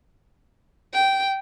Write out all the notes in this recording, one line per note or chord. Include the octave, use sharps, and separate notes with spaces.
G5